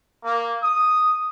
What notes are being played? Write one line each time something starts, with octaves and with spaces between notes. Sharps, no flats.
A#3
D#6